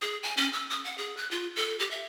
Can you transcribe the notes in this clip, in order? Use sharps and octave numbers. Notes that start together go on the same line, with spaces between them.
G#4
G#5
C#4
E6
D#6
F#5
G#4
F#6
F4
A4
G4
E5